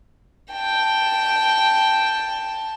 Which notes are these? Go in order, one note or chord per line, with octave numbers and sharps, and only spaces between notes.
G5 A5